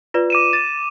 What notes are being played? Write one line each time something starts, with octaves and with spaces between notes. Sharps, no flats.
F4 B4 D5
D6 D#7 E7
A6